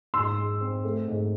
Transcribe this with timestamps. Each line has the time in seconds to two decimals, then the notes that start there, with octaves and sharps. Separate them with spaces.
0.14 G#2 C6 E6
0.37 G#3
0.61 C4
0.84 A3
1.08 G#2